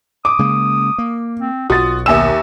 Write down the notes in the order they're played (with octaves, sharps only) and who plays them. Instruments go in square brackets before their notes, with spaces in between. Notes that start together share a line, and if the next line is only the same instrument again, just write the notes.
[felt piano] D6 [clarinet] D#6
[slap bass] C#3 G#3 A#3
A#3
[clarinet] C4
[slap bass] B1 [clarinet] F4 [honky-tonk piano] F#4 [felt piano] D#6 A6
[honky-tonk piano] D#2 E7 [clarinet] B3 [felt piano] E5 G#5 E6